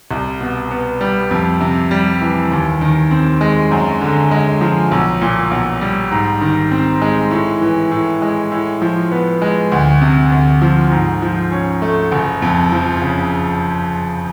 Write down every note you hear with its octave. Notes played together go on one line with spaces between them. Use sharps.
C2
B2
B3
G3
F2
C3
G3
E3
D#2
D#3
C4
G#3
F#2
D3
G#3
F3
B1
A#2
B1
G3
G#2
D#3
C4
G#3
A2
E3
A2
G#3
A2
F3
B3
G#3
D2
C3
D2
F3
G#2
F3
C#4
A3
F#1
F2
F3
C#3